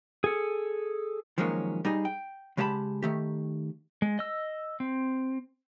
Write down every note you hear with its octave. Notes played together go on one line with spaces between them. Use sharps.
G#4 A4
D#3 F3 F#3 G#3 A#3 C#4
G3 D#4 G#4
G5
C#3 G#3 G4 D#5 A5 B5
D#3 A3 G4
G#3
D#5 E6
C4